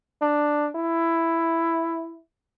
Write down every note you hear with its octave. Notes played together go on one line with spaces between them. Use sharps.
D4
E4